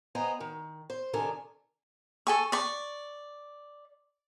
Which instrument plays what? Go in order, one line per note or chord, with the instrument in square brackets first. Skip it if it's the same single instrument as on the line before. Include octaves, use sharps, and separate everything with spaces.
[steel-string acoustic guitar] B3 C5 D#5 G5 G#5 A#5
D#3
C5
C3 D#3 D4 A4 A#4 G#5
[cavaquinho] A4 G#5 C#6
D5 C#6